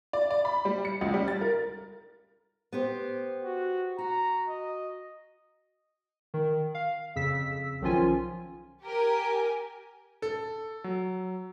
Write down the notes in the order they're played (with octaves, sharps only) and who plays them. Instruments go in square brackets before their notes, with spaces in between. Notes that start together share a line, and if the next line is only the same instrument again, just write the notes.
[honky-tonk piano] D5
D5
B5
G3
C#7
C#2
G3
A6
A#4
[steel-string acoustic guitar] B3 G4 C5
[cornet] F#4
[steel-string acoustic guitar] F#4 [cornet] A#5
[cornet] D#5
[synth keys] D#3
F5
F2 C#3 E6 B6
B1 D#3 F3 C#4 F4 G#5
[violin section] G4 A#4 G#5
[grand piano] A4
[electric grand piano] F#3